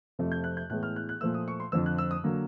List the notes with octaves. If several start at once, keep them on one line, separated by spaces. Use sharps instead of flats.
F2 C3 F3 A3
G6
F#6
G6
A2 E3 G#3 B3 F#6
F6
F#6
F#6
A#2 F3 A3 E6
D#6
C#6
C6
F2 D3 F3 E6
F#6
E6
D#6
D3 F#3 A#3